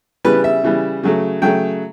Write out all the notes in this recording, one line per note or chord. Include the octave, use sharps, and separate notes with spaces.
C#3 E3 G3 B4
E5
C#3 E3 G3
C#3 F#3 A3
C#3 F#3 A3 G5